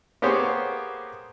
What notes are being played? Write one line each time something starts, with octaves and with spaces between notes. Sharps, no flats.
A#3 B3 G4 G#4 C5 C#5